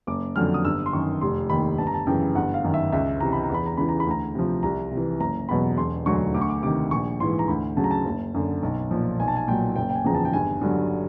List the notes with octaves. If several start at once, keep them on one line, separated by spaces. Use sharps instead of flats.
F#1 D6
F2 D3 F#3 F6
D#6
G1 E6
C6
F#2 D#3 C#6
F1 C6
D#2 D#3 B5
G1 A5
A#5
A5
F#2 C#3 E3 G5
G1 F#5
F5
F#2 D#3
E5
C#2 E5
C3 E3 A#5
B5
A#5
E2 B5
A#5
C#3 E3 B5
A#5
B5
D2 A#5
C3 F3
C2 A#5
C3
E3
F#1 A#5
E2 B2 F#3 B5
E1 C6
D2 D3 F#3 C#6
D2 D6
C#6
D6
C3 D#3 D6
A#1 C#6
G#2 E3 C6
A#5
D2 B5
C#3 F#3 A5
A#5
A5
F#1
F#2 D3
B1
A#2 F3
B1 G#5
A5
G#5
A#2 F#3 G5
F#1 G5
G5
G#5
E2 C#3 F3 A#5
A5
G5
G1 G#5
G2 D3 F#3